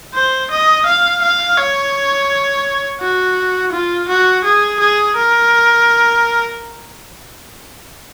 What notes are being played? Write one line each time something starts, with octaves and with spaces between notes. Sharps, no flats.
C5
D#5
F5
F5
C#5
F#4
F4
F#4
G#4
G#4
A#4